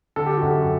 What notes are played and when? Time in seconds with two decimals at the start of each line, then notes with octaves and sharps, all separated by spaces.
0.16 D3 A4
0.26 G4
0.37 F#2 F#4
0.48 G4